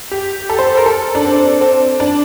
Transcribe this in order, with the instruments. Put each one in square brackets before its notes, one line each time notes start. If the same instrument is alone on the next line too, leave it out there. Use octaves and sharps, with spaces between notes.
[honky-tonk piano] G4
A4
C5
A#4
A4
D4
C4
C4
D4